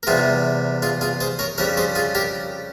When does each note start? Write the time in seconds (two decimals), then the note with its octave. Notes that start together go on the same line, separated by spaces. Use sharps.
0.03 A#4
0.07 E2 C3 G3 F4 G#4
0.82 F4 G#4
1.01 F4 G#4
1.20 G#4 C5
1.39 A#4 C#5
1.58 F2 C#3 G3 A#4 C#5
1.77 G#4 C5
1.95 F4 G#4
2.15 G4 A#4